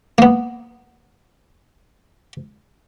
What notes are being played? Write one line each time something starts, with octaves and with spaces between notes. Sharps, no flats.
A#3 B3